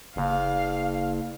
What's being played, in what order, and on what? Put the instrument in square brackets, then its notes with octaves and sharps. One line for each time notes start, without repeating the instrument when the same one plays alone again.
[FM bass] F#1 [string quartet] F5